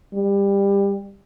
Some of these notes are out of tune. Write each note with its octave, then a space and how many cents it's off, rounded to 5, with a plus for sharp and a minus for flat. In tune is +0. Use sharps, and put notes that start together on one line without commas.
G3 +20